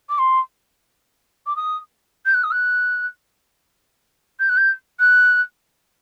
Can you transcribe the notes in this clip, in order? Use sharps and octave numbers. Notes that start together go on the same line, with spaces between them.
D6
C6
D6
D#6
G6
F#6
D#6
F#6
G6
F#6
G6
F#6